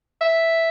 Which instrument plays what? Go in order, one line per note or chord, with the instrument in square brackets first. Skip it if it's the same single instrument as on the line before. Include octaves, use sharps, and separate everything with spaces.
[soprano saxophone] E5